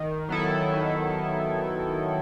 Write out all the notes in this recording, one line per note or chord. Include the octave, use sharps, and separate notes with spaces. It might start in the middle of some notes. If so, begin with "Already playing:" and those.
Already playing: D#3
F#3 B3 E4 A4
D#3